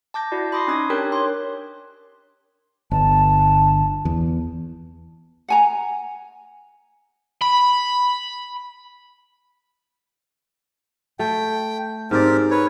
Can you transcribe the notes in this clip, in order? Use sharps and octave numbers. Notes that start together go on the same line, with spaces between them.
A5 D6 G6 A#6
E4 F#4 D5
B5 C6 D6 D#6 A#6 C7
C#4 D#4 D#6 G#6
D4 G4 A#4 C#5 G5 F#6
C#5 C6 D6
G1 A5
E2
F#5 G#5 A#5
B5
A3 G5
G#2 C4 G4 A#4 D5
B4 C#5